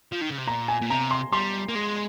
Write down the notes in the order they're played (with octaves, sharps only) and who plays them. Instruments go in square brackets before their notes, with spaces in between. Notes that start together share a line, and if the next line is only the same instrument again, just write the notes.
[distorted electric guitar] F3
D#3
C#3
C3
[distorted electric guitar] A#2 [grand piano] A#5
[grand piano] G#5
[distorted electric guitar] A#2
[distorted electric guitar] C3 [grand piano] A#5
[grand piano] C6
[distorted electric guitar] G3 [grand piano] C6
[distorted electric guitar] A#3
G#3